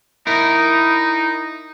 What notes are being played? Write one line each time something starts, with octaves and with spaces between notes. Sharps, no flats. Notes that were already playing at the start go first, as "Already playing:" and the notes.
D#4 E4 A#4